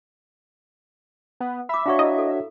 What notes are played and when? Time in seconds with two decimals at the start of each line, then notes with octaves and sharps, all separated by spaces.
1.40 B3
1.69 E5 B5 D6
1.86 D4 F#4 C#5 F5 C#6
1.99 E4 D#5
2.18 A4